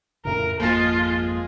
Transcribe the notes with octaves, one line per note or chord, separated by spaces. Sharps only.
F2 A2 C#3 A#4
G#1 F2 F3 G#3 A#3 F4